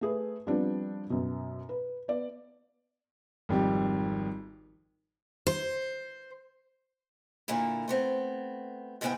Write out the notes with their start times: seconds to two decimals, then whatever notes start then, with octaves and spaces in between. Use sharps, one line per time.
0.01 A3 G#4 B4
0.47 F3 G3 B3 C4 D4
1.10 F#2 B2
1.69 B4
2.08 B3 D5
3.49 G#1 F2 G3 G4
5.47 C5
7.48 A#2 D3 A#3 E4
7.88 A3 B3 C4
9.01 G#2 C#3 G#3 B3 E4 G5